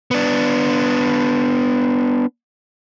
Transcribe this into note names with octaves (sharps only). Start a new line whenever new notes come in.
B3 D4